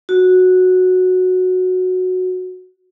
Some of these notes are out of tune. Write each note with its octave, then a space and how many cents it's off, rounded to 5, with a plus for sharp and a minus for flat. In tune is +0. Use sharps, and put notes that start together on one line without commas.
F#4 -10